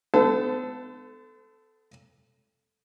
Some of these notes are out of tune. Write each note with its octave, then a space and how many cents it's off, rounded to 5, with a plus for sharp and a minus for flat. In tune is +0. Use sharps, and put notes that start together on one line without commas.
B3 +35 A4 +0 C5 -40